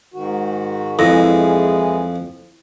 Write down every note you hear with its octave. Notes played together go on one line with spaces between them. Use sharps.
G#2 D#3 F#4
F2 E3 G#3 E4 G#4 A#6